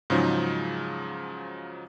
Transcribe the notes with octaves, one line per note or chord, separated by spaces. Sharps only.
G#2 C#3 F3 F#3 D#4